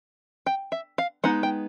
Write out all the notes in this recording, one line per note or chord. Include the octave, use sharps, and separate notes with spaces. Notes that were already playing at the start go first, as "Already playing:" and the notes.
G5
E5
F5
G#3 B3 D#4 F#5
G5